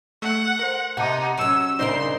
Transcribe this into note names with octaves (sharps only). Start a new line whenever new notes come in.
A3 F#5
A#4 C5
C3 D#4 F#5 A5 D6
F#3 C#4 E6
G2 C#3 D#4 A#4 C5 D5 C6